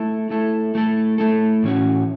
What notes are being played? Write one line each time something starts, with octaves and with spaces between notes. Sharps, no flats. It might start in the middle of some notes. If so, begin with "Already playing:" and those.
Already playing: A3 E4 A4
A3 E4 A4
A3 E4 A4
A3 E4 A4
A2 E3 C#4 F#4